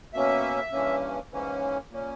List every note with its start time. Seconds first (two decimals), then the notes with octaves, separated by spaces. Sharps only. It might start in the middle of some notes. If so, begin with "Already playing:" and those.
0.13 B2 A#3 C#4 E5
0.72 G2 E3 A#3 C#4
1.31 G#2 E3 A#3 C#4
1.90 A#2 A#3 C#4